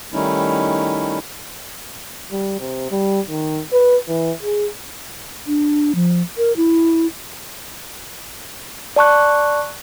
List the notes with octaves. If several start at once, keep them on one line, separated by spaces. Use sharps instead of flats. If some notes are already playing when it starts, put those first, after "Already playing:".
D#3 G3 A3 C#4 D#4 E4
G3
C3
G3
D#3
B4
E3
G#4
D4
F3
A#4
E4
D5 A5 C#6 F#6